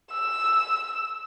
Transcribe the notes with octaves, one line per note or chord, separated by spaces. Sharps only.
E6